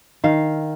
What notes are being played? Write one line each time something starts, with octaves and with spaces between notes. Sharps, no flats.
D#3 F5